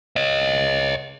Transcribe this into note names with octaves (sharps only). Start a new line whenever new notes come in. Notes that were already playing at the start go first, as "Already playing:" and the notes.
C#5 D#5